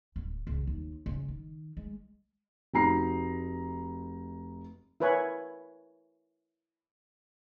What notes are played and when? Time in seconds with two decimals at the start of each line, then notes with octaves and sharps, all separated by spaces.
0.16 D1
0.47 C#2
0.67 D#2
1.06 C#2
1.28 D#3
1.77 G#3
2.74 F1 D#4 F#4 A#5 B5 C7
5.00 E4 A#4 B4 C#5 G#5